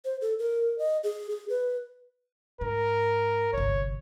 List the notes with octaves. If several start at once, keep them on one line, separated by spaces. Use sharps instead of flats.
C5
A4
A#4
D#5
G#4
G#4
B4
G#2 A#4
G1 C2 C#5